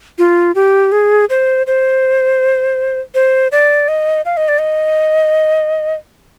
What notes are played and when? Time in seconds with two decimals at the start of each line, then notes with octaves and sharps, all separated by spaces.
0.18 F4
0.55 G4
0.92 G#4
1.30 C5
1.67 C5
3.15 C5
3.52 D5
3.88 D#5
4.25 F5
4.37 D#5
4.48 D5
4.59 D#5